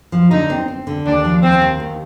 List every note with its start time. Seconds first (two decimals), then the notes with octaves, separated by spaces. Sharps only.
0.12 F3
0.31 D3 D#4
0.50 C4
0.68 C4
0.87 D3
1.06 D#2 D4
1.25 F3
1.42 D#2 C4
1.62 D#3
1.80 D#2